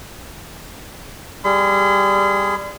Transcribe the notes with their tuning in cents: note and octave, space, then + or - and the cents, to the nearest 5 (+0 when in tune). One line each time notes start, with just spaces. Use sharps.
G3 +5 G#4 +0 C6 -40